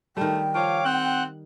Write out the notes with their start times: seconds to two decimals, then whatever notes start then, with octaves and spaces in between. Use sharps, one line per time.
0.17 D#3 G3 A3 G5
0.55 F3 C#5 F5 D6
0.85 C4 F#5 F#6